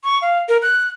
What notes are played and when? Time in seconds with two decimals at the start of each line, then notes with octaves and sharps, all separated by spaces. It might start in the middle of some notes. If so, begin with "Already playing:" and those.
0.04 C#6
0.22 F5
0.49 A#4
0.62 F#6